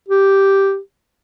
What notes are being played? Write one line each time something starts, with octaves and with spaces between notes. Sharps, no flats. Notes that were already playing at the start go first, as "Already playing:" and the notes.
G4